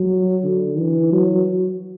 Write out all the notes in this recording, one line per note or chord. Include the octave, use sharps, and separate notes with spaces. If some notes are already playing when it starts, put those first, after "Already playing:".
Already playing: F#3
D3
E3
F#3